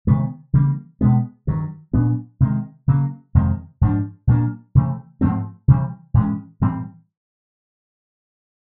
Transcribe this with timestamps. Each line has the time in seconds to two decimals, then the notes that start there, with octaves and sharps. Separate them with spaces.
0.07 C3 D#3 G#3 B3
0.53 C#3 E3 G3 A#3
1.01 B2 G#3 B3
1.47 G2 D#3 F#3
1.93 A#2 F#3 B3 D4
2.40 C3 D#3 G#3
2.88 C#3 F#3 A#3
3.35 F2 C3 D#3 G#3
3.81 G#2 F3 A3 D4
4.27 A#2 F#3 A#3 D4
4.75 C3 E3 A3
5.21 G#2 F3 A3 C4
5.68 C3 E3 G3
6.14 A2 E3 G#3 C#4
6.61 A2 E3 G3 C4